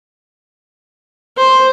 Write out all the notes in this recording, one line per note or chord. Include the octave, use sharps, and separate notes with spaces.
C5